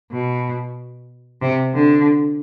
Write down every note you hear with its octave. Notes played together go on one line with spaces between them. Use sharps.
B2
C3
D3